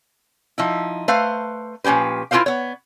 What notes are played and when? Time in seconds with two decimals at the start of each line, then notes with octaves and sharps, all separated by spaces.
0.58 F3 D#4 E4
1.08 A3 B4 C5 F5
1.84 A#2 F3 C#4 G4 B4
2.31 E4 F4 G4 A#4 C5 F5
2.46 B3 C#5